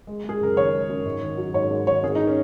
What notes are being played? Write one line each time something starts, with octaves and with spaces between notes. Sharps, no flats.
G#3
G#3 G#4
F#1 A#4
D#3 C#5
G#3
F#2
G#2
D#3
F#3
G#2 C#5
G#2
D#3 C#5
G#1 G#4
D#4
C#4